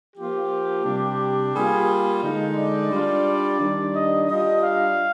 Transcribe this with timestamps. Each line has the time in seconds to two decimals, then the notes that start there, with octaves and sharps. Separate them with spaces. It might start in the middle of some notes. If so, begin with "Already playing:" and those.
0.16 F3 A#3 F4 G4
0.85 C3 G3 D4
1.53 G3 A#3 F4 G#4
2.22 D3 G#3 D#4
2.57 D5
2.91 G3 D4 F4
3.60 D#3 G3 D4
3.94 D#5
4.28 G3 D4 F4 D#5
4.63 F5